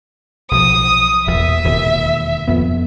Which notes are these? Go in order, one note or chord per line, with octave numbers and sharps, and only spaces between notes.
B1 F3 D#6
E1 E2 A#2 E5
E1 D#2 A#2
F2 F3 B3